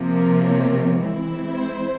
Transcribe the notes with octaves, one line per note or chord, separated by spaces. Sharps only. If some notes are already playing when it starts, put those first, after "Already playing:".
Already playing: C3 F3 A#3
C#5
E3 G#3 C4 E4
C5